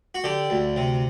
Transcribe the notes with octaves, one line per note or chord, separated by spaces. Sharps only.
F#4
D3 G4
D2
C3